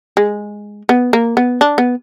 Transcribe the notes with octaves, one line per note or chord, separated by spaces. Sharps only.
G#3
B3
A#3
B3
D4
B3